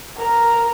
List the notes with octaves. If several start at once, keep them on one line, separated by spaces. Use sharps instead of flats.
A#4